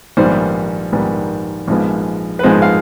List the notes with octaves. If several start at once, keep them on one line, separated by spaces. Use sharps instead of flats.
A#1 G#2 D#3 G3 B3 C5
A#1 G#2 D#3 G3 B3
A#1 G#2 F3 G#3 B3
B4
A#1 G#2 F3 G#3 B3 C5
F5